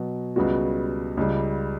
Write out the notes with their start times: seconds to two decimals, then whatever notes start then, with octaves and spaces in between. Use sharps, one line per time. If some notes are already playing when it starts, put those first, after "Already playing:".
Already playing: B2 F#3 B3
0.36 C#2 C#3 G3 B3 F#4
1.17 C#2 C#3 G3